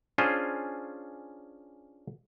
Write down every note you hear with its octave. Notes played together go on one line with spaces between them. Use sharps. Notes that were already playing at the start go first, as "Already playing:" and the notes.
C#4 D4 F4 G#4 C5